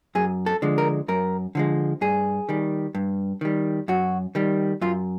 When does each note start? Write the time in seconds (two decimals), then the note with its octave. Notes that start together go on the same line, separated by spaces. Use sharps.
0.15 F#2 G#4
0.46 A4
0.62 D3 F3 G#3
0.78 A#4
1.08 F#2 A#4
1.55 D3 F3 G#3
2.01 G2 G#4
2.49 D#3 G3
2.95 G2
3.41 D#3 G3
3.88 F#2 F#4
4.35 D#3 G3
4.81 F#2 F4